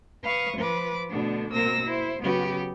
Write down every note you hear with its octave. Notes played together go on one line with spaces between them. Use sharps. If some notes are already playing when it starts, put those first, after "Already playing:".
B4 F5 C#6 D#6
F3 B4 D6
B2 D3 A3 B3 D4
B2 A#3 C4 A#4 E6 A#6
E4 C5
C#3 F#3 B3 F#4 G4 B4